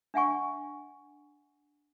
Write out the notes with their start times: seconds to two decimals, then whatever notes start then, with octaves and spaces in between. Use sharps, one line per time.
0.14 D4 E5 F#5 G#5 C#6